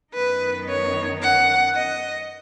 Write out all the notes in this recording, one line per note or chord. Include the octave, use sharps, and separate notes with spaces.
F#2 D#3 B3 D#4 B4
C#5
F#5
D#5